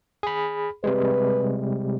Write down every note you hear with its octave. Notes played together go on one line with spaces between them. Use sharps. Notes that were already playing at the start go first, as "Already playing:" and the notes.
G#4 B5
C3 G3 G#3 B4